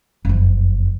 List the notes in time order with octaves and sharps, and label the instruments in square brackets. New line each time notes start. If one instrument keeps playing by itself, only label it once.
[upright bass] F#1 F2